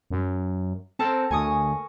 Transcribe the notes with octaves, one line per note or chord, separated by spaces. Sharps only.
F#2
C4 A4 A#4 A5
D2 G#5 C#6 D#6